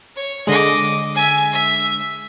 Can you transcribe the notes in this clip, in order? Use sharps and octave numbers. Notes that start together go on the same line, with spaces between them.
C#5
D3 G#3 D#5 D6
E5 G#5
E5